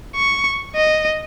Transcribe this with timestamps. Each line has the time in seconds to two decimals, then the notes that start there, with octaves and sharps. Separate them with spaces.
0.15 C#6
0.76 D#5